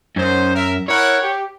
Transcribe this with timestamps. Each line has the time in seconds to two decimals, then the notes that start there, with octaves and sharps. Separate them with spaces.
0.16 F#2 C#4 D#4 C5
0.54 A#4 E5
0.88 E4 A#4 C#5 F#5
1.21 G4